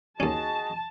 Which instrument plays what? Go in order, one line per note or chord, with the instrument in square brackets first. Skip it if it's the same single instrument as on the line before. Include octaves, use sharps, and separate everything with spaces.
[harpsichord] D#2 C#4 [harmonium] F#4 G#4 D#5 [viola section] A5